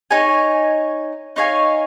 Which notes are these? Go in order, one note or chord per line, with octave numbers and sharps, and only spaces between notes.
D#4 C#5 G#5
D#4 C#5 F5 G#5